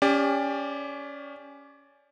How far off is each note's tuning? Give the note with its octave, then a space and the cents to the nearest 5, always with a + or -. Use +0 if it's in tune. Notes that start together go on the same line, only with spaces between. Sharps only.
C#4 +15 G4 +30 D5 +0